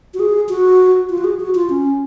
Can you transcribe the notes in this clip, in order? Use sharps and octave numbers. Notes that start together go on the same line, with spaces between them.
F#4
G#4
F#4
F4
F#4
G#4
F#4
F4
C#4